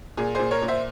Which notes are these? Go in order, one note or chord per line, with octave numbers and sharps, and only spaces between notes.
A#2 G#4
A#2 G#4 C5
A#4 C#5
A#2
C5 E5